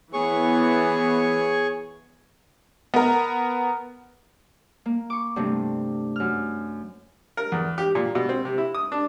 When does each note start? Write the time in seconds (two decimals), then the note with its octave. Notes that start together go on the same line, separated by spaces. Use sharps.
0.13 E3 B3 G#4 C#5 C#6
2.94 B3 A#4
4.86 A#3
5.10 C#6 D6
5.36 G2 C3 G3 A3
6.16 F#2 F6
7.37 A#4
7.52 E2
7.78 G4
7.95 A#2
8.15 B2
8.29 C4
8.45 C3
8.58 E4
8.75 D#6
8.92 D4